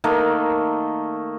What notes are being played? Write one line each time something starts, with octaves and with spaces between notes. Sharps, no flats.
D#3 A3 A#3 D#5